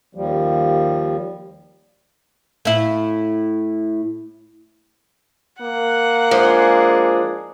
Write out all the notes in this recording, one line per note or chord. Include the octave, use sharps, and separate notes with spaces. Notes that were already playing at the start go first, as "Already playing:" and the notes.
D#2 F3 G3
A2 E4
A#3 F#5
F3 G#3 D4 G#4